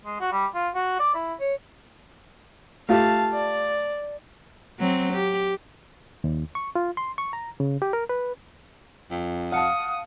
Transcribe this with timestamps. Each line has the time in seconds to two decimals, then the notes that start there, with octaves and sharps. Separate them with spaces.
0.05 G#3
0.20 F#4
0.32 G3
0.55 F4
0.75 F#4
1.00 D5
1.15 E4
1.40 C#5
2.89 A3 F4 G4 F5 A5
3.33 D5
4.79 F#3 C4
5.13 G4
6.24 D#2
6.55 C#6
6.75 F4
6.97 C6
7.18 C#6
7.33 A#5
7.60 C#3
7.82 G4
7.93 A#4
8.09 B4
9.11 F2
9.52 F5 F#5 A5 D#6 C#7